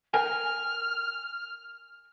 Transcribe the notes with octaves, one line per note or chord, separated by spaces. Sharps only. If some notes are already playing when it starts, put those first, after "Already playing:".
A#4 G5 G#5 F6